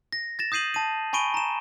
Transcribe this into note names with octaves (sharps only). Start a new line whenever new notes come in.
A#6
A6 A#6 E7
D#6 G6 C7 D#7 F#7
A5 D#7
G#5 B5 C#6 D7 D#7 G7
A#5 E7